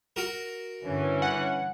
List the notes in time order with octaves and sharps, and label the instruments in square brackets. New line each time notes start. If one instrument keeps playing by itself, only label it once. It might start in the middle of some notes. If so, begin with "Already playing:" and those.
[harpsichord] F#4 A#4
[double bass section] G2 D3 [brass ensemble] E3 C#4
[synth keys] F#5